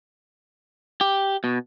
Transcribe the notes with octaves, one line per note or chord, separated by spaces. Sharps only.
G4
B2